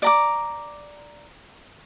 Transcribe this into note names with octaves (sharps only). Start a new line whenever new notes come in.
D5 A#5 D6